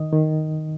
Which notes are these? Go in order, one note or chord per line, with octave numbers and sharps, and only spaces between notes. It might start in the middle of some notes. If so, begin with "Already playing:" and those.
Already playing: D#3 D#5
D#3